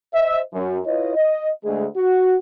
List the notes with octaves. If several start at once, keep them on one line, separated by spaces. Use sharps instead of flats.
C5 D#5 E5
F#2
E4 F4 B4 C#5 D#5
D#5
D2 G#3 G#4
F#4